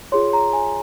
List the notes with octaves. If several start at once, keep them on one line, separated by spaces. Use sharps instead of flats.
F4 G#4 C#5 C6
A#5
G#5